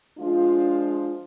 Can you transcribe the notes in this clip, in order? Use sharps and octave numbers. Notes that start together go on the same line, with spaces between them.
F3 G#3 D4 F4